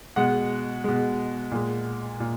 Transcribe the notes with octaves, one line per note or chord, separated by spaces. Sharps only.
B2 G#3 F#5
B2 G#3
A#2 G#3
A#2